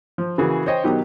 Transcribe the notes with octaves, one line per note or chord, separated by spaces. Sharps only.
F3
C#3 E3 A#3 F#4 G#4
C5 C#5 D#5 G5
B2 D#3 F#3 D#4 G4